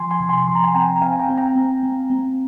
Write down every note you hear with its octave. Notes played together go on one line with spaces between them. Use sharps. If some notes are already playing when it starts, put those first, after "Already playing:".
Already playing: F3 G#5 C6
G#5 C6
C3
G#5 C6
F3 C6
A#5
G#5 C6
C4 G5 A#5
A#5
C4 F5 G#5
G5 A#5
C4
G5 A#5
C4
C4
C4